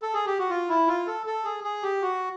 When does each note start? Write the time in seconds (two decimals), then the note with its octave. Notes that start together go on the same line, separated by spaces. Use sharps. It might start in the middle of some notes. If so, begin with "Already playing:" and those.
0.02 A4
0.14 G#4
0.26 G4
0.39 F#4
0.49 F4
0.69 E4
0.87 F4
1.07 A4
1.26 A4
1.44 G#4
1.64 G#4
1.83 G4
2.02 F#4